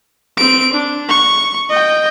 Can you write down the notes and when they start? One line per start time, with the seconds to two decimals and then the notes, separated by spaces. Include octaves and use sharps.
0.38 C4 D7
0.73 D4
1.09 C#6
1.69 D#5 G5